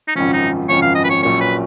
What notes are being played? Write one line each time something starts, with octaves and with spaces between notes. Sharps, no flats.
D#4
G#1 F#2 C#3 F3 C#4
D#4
G#1 F#2 C#3 F3 C#5
F5
D#5
B4
C#5
A#1 A#2 F#3 C#4 C#5
B4